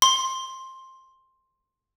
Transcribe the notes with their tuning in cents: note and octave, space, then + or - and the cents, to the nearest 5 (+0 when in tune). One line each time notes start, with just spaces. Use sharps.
C6 +10